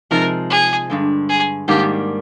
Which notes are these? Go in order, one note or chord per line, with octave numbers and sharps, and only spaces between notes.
C3 F3 G#3 D#4 A#4
G#4
G2 D3 G#3
G#4
G#2 D#3 G3 A#3 D4 G4